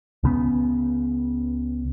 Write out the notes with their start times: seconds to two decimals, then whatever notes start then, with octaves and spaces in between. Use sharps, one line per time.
0.23 C#2 C#3 B3